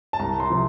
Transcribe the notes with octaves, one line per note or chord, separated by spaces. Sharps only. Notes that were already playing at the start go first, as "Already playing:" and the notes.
A5
C2 A#5
C6
C3 F3